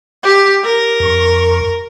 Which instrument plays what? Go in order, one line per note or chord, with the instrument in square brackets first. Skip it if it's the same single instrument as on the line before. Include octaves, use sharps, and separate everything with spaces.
[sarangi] G4
A#4
[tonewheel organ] F2 C#6